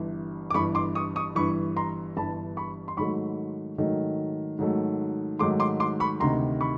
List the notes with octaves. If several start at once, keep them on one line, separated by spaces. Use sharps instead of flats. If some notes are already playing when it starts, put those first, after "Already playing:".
Already playing: G1 G2 E3
D6
G1 G2 E3 B5 C#6
C6 D6
C#6 D#6
C#6 D#6
G1 G2 E3 B5 C#6
A#5 C6
G1 G2 E3 A5 B5
B5 C#6
C6
G#2 D#3 F#3 A3 B5 C#6
G#2 D#3 F#3 A3
G#2 D#3 F#3 A3
G#2 D#3 F#3 A3 C6 D6
C6 D6
C6 D6
B5 C#6
D2 C3 D#3 A#5 C6
B5 C#6